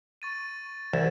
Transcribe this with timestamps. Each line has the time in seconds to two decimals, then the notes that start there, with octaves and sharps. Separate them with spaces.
0.22 C#6 A6 D#7
0.93 C2 E3 E7